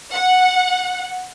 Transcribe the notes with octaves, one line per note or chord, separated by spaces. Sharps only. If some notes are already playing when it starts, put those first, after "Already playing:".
F#5